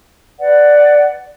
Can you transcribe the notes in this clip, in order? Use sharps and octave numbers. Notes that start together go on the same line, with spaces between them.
B4 D5 F#5